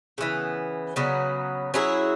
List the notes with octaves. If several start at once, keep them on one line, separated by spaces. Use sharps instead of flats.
C#3 E3 B3
C#3 F#3 B3
F#3 C#4 E4 G#4